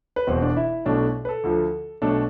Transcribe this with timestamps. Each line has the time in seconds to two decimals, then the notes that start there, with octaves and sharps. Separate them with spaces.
0.16 B4
0.27 E1 E2 B2 C4 C5
0.42 D4 D5
0.56 E4 E5
0.85 B1 B2 A3 D4
1.25 B4
1.29 A4
1.44 D2 D3 F3
2.02 B1 B2 A3 D4 A4